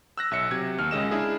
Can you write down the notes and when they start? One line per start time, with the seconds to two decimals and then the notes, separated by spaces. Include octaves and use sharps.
0.18 E6 F#6 A#6
0.31 B1 E5 E6 C#7
0.51 C3 F#3 G#6
0.78 D#2 F6
0.91 C#2 C#3 G#3 D#5 E7
1.11 D4 E4 G#4